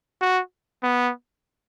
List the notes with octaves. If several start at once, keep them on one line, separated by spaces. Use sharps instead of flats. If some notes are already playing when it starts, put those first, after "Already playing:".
F#4
B3